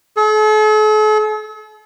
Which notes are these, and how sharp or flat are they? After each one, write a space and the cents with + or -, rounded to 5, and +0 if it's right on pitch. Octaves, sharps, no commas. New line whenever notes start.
A4 -45